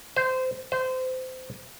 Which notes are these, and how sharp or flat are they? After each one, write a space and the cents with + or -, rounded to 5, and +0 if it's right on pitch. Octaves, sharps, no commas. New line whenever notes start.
C5 -20
C5 -25